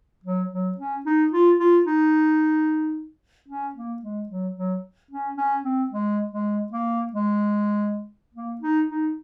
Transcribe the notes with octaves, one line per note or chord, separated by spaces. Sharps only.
F#3
F#3
C#4
D#4
F4
F4
D#4
C#4
A#3
G#3
F#3
F#3
C#4
C#4
C4
G#3
G#3
A#3
G#3
A#3
D#4
D#4